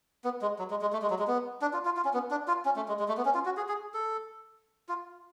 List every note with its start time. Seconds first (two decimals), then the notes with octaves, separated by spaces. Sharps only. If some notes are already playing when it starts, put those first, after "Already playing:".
0.24 B3
0.42 G#3
0.59 F#3
0.70 G#3
0.81 G#3
0.93 A3
1.02 G#3
1.10 F#3
1.19 G#3
1.27 B3
1.61 D4
1.73 F4
1.85 F4
1.97 F4
2.05 C#4
2.14 B3
2.31 D4
2.48 F4
2.65 C#4
2.76 A3
2.88 G#3
2.99 G#3
3.08 A3
3.17 B3
3.25 C#4
3.34 F4
3.45 F#4
3.57 G#4
3.68 G#4
3.94 A4
4.89 F4